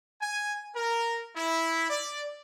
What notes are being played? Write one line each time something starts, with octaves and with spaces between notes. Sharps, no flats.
G#5
A#4
E4
D5